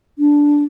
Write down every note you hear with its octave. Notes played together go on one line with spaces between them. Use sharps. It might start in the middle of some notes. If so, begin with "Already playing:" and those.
D4